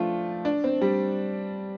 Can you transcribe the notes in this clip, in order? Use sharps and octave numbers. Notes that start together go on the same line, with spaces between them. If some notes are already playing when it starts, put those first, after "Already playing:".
Already playing: F3 A3 D4 F4
D4
C4
G3